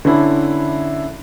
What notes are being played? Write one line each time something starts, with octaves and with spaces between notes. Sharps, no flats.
D3 C#4 D4 E4